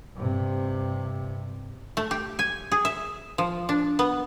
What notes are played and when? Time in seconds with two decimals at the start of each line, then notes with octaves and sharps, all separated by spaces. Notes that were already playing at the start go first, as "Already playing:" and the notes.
0.15 G2 C3
1.97 A3
2.11 G4
2.39 G#5
2.72 G#4
2.85 E5
3.38 F3
3.69 D4
3.99 B3